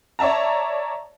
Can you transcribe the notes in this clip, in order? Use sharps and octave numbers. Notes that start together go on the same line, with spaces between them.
C#5 D5 E5 A5 A#5